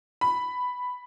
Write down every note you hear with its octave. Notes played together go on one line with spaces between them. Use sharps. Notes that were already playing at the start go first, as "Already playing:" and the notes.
B5